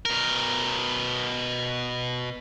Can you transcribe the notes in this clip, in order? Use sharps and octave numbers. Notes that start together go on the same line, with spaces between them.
B2 A#4